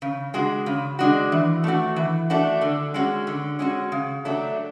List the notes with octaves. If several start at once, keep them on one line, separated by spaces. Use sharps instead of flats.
C#3
G#3 D4 F#4
C#3
G#3 D4 F#4
E3
A3 D4 F#4
E3
A3 D4 F#4
D3
G#3 C#4 F#4
D3
G#3 C#4 F#4
C#3
F#3 A3 D4